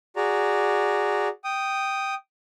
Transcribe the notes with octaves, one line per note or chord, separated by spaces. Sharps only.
F#4 G#4 D5 A#5
G5 D#6